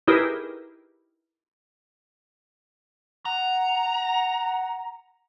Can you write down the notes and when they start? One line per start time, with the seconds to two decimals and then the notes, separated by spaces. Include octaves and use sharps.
0.07 D#4 E4 G4 G#4 A#4 B4
3.25 F#5 A#5